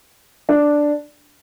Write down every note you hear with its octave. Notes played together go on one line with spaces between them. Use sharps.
D4